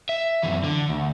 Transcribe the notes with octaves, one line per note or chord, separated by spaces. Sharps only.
E5
F#2 E3
D3
D2